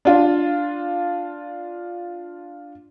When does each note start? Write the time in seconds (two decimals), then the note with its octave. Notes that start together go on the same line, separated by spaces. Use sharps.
0.05 D4 F4